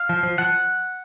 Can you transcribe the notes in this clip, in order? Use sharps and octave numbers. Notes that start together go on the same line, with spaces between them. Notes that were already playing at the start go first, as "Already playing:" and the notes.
Already playing: F5
F3
F3
F3 F#5